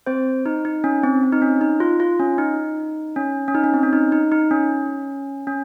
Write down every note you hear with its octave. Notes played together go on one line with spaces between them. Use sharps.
C4 C5
D#4
D#4
C#4
C4
C4
D#4
C#4
D#4
F4
F4
C#4
D#4
C#4
C#4
D#4
C#4
C4
C#4
D#4
D#4
D#4
C#4
C#4